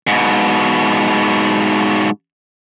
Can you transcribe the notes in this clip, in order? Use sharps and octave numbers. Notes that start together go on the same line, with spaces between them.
G#2 B2